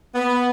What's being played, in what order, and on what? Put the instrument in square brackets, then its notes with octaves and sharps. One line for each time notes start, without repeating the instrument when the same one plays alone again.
[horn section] B3